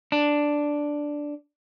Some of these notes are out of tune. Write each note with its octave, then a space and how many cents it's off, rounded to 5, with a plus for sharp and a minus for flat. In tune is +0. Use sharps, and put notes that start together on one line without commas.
D4 +0